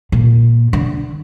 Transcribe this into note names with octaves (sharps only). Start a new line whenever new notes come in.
A#2
D3